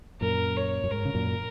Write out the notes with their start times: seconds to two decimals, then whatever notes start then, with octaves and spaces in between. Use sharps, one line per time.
0.21 F#2 A#2 A#4
0.56 C#5
0.84 F#2
0.91 G#2 A#4
1.05 C#3
1.14 F#2 A#2